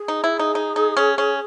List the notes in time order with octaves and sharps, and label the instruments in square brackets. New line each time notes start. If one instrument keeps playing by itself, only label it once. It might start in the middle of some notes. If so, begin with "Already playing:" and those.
Already playing: [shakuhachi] G#4
[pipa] D#4
E4
D#4
D#4
D#4
C#4
C#4